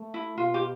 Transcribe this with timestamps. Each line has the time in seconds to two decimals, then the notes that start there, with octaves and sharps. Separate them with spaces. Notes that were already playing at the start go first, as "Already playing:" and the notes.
Already playing: A3
0.14 E4
0.38 B2 F4
0.54 G4